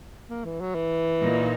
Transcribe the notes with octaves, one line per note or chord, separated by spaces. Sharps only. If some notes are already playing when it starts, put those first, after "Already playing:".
A#3
E3
F#3
E3
A#2 A#3 D#4